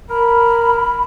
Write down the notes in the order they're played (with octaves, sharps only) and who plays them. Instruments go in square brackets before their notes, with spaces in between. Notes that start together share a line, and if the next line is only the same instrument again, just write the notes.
[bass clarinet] A#4 [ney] B5